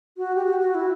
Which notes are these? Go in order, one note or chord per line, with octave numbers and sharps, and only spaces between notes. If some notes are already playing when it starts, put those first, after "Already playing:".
F#4
G4
F#4
F#4
E4